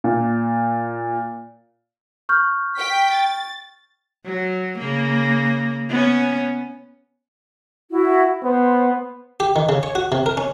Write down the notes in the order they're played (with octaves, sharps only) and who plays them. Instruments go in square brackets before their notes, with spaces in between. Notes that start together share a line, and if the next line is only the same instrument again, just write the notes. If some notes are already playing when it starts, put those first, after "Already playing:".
[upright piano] A#2
[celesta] C#6 F6 G6
[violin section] G5 B6
A6
[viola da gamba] F#3
C#3 A#3
B3 C#4
[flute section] E4 F#4
[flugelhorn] B3 [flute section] C5
[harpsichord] G4
D#3
C#3
C#5
F#4
C3
A#4
C#4